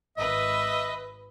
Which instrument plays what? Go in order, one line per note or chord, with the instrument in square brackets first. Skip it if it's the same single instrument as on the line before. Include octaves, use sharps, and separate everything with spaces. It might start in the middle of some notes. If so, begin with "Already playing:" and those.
[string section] G#1 B4 [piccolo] D#5 [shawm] E5